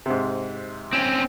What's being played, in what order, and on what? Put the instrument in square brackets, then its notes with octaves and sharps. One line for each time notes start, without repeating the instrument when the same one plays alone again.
[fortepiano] G#2 C3
[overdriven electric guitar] C4 C#4